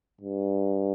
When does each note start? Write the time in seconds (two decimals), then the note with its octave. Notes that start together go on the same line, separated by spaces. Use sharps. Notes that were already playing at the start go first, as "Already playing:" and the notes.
0.21 G2